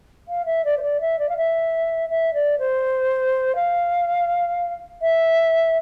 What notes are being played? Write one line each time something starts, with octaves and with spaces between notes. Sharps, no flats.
F5
E5
D5
C5
D5
E5
D5
F5
E5
E5
D5
C5
F5
E5